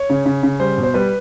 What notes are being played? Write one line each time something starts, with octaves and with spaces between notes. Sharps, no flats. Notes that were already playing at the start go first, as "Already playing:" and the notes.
Already playing: C#5
C#3
C#3
C#3
G3 C5
B2
C5
G3 B4